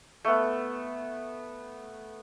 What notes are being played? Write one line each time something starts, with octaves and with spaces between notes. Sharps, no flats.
A3 B3